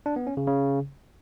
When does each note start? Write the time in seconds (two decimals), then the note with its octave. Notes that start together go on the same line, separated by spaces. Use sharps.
0.06 D4
0.16 B3
0.27 C#4
0.37 C#3
0.48 C#3